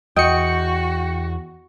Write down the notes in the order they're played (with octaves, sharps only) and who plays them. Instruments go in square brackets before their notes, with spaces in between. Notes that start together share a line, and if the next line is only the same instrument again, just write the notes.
[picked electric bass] E2 [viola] F#4 [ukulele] D#5 [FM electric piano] G5 C#7